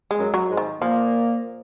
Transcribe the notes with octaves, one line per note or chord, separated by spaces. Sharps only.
G#3
F#2 F#3
F#3
G#2 G#3
D#3
A#2 F3 A#3